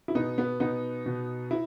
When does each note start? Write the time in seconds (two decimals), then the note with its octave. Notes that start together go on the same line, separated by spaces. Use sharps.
0.08 E4
0.15 B2 B3 D#4
0.38 B3
0.60 B2 B3 D#4
1.06 B2
1.51 E4